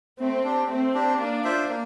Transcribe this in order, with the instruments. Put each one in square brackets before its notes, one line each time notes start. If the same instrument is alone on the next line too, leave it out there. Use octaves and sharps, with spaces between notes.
[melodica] A3 [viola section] C4
[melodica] D4 G4
[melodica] A3 [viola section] C4
[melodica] D4 G4
[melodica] A#3 [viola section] D4
[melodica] F4 C5 E5
A#3